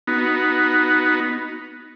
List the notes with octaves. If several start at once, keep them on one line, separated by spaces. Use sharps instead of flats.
B3 D#4 F#4